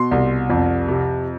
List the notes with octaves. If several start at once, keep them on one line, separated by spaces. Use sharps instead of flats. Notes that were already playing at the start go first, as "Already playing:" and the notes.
Already playing: B2 C6
C2
F2
C3